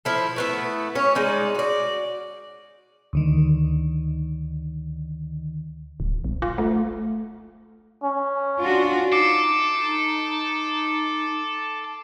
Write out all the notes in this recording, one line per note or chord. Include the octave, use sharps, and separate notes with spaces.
F3 E4 A4
A3 B3 E4
C#4 C#5
G#3 D#4 D5
F#4 D5
D2 D3 D#3
D1
A#1
F4
A3
C#4
D4 F4 F#4
D#4 A4 D6 C7 D7